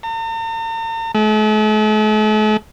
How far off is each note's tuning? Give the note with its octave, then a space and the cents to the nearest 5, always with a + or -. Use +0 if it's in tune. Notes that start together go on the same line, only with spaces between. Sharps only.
A#5 -45
A3 -45